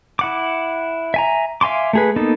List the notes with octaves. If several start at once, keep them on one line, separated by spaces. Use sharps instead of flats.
E4 F#5 D6
E5 G#5 A#5
E5 F5 G#5 C6 D6
A3 G#4 B4
A#3 B3 D#4 A4